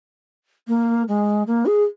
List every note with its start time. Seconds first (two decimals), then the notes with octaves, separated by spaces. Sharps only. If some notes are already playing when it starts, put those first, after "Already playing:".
0.67 A#3
1.08 G#3
1.47 A#3
1.66 G#4